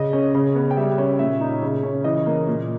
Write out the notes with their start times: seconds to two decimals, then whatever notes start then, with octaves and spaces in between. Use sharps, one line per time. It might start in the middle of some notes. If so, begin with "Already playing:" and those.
Already playing: C#3 D#5
0.13 C#4
0.35 C#3
0.55 B3
0.71 G5
0.77 G3 E5
0.98 C#4
1.19 A#2 E5
1.41 D#4
1.63 C#3
1.83 C#4
2.04 E3 D#5
2.26 A#3
2.47 A#2